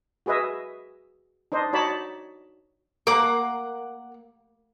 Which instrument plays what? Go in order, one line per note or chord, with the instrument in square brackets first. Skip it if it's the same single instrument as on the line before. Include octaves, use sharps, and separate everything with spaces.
[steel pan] F#4 G#4 B4 D#5 E5
D4 D#4 C5 D#5
D#4 F#4 C#5 D5 A5 B5
[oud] A#3 [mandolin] F#5 D6